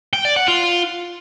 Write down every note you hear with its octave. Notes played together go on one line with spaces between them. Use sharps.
G5
D5
F#5
F4